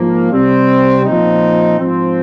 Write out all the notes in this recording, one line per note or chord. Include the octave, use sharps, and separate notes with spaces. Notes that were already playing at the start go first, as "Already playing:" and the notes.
Already playing: G#2 F3 A#3
C3 G3 C4
A#2 F3 C4 D#4
G#2 F3 C4